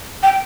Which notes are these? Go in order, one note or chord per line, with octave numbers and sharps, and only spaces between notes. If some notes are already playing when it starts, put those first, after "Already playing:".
G5